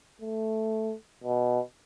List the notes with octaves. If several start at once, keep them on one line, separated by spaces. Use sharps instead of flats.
A3
B2